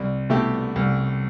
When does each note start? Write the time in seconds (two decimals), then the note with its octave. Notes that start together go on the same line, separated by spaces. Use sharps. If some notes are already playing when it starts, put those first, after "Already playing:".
Already playing: C2
0.29 B2 A3 E4 G4
0.76 C2